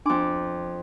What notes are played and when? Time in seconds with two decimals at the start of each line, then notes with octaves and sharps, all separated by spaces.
0.06 F2 D4 C6 D6